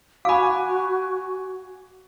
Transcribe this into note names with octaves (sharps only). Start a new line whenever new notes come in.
F#4 F5 G#5 B5 D6